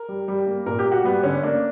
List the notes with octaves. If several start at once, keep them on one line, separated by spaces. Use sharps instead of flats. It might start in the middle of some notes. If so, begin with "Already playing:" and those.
Already playing: A#4
G3
G3
A#3
A#2 A#4
G4
A#3
F#4
G3 B3
D3 C#4
A#3 D4